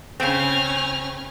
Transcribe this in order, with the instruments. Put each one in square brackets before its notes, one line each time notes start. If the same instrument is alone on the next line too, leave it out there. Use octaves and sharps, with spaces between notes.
[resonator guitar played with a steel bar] C#3 C4 [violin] C#4 F6